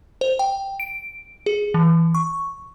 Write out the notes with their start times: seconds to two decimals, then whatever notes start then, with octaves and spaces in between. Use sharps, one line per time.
0.21 C5
0.39 G5
0.80 D7
1.46 G#4
1.74 E3
2.15 C#6